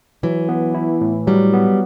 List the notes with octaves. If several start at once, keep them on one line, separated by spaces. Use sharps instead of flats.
E3 F#3
B3
E4
A2
F#3 G3
B3